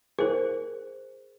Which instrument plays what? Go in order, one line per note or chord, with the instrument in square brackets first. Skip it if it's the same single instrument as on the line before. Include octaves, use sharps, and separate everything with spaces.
[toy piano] G#4 C5 [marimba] A#4 F#6